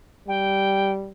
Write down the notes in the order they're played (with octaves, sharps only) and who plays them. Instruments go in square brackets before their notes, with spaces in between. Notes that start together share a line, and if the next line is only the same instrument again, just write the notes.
[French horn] G3 [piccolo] G5